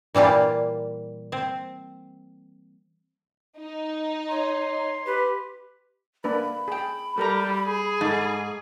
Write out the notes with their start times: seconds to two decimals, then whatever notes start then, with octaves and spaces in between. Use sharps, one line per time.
0.15 A#2 E3 G3 A#3 F4
1.32 C4
3.59 D#4
4.30 C#5 C6
5.06 G4 B4
6.24 A#3 D4 B4 B5
6.68 G#4 G5
7.18 G3 A4 A#4 A#5
7.64 G#4
8.01 G#2 A4 A5